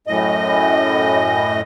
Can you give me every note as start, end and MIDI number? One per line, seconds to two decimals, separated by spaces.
0.07 1.61 42
0.07 1.61 45
0.07 1.61 75